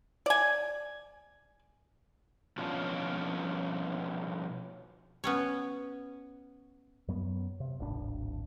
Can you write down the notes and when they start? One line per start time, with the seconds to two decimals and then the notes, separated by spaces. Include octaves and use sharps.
0.26 D5 G#5
2.58 B2 F3 C#4 D4 F4 G#4
5.24 B3 C#4 C#5
7.08 F#2 F#3 B3
7.60 C3
7.79 D1 G#1 D4